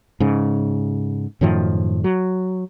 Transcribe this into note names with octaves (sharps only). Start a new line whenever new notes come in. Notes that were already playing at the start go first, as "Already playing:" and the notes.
G#2 C#3
F#2 A2 D#3 F3
F#3